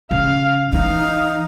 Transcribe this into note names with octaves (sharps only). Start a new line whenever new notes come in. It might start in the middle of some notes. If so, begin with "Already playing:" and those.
C#3 F5
E3 D#4 F5